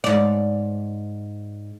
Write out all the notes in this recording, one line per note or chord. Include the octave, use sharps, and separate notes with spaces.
G#2 D5